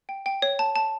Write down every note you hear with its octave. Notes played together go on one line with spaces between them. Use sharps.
G5
G5
C#5
A5
A5